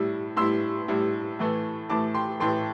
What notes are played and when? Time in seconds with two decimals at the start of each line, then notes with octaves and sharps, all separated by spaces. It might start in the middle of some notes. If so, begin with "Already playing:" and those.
Already playing: A2 G3 E4
0.37 A2 G3 E4 C6 E6
0.88 A2 G3 E4
1.39 A2 E3 A3
1.90 A2 E3 A3 A5 D6
2.15 G5 C6
2.40 A2 E3 A3 G5 C6